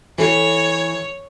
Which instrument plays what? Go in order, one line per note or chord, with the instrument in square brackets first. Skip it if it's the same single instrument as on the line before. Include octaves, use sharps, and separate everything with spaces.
[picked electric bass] E3 [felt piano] A4 [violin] C#5